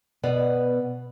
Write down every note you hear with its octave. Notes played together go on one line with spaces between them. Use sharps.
B2 B3 D5